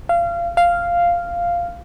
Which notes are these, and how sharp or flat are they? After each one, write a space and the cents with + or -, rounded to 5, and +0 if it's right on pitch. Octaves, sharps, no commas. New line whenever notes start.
F5 -25
F5 -5